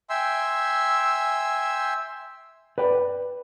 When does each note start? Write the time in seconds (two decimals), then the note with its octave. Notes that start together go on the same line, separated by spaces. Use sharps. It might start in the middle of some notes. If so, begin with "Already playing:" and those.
0.10 E5 G5 G#5 C6 E6
2.78 B4 D5 G5